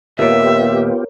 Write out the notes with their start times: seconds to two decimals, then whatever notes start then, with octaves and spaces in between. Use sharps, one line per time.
0.19 D#2 A#2 B3 F4 G4 A#4 C#5 E5